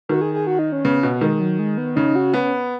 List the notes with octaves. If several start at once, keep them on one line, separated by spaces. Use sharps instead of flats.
D#3 F#4
G#4
G#4
F#4
D#4
C#4
C#3 B3
B2 B3
D#3 G#3
F#3
G#3
B3
C#3 D#4
F#4
B3 C#4